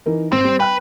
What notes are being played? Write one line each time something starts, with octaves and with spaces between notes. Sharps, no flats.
E3 D#4 A#4
G#1 C4
G3
B4 G5 F#6